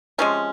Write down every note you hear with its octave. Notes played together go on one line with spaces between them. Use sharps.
C3 F3 G#3 C#4